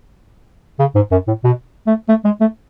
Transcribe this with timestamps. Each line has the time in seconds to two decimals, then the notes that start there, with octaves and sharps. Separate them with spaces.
0.79 C#3
0.95 G#2
1.11 F#2
1.27 A2
1.44 B2
1.87 A3
2.09 A3
2.25 G#3
2.41 A3